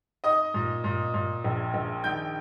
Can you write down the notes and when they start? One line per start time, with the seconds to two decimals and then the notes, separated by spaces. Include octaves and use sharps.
0.24 D#4 D#5 D#6
0.54 A#2
0.84 A#2
1.14 A#2
1.44 A#1
1.74 A#1
2.04 D#3 G5 G6